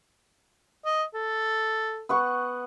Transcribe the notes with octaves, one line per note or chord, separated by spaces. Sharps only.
D#5
A4
B3 F#5 C#6